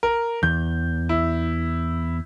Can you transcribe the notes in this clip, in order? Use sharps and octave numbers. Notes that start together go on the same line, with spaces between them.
A#4
E2 G6
E4